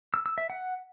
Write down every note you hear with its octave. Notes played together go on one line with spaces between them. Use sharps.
E6
E6
E5
F#5